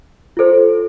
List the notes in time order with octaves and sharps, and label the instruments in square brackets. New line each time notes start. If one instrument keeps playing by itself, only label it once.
[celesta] F4 A4 C5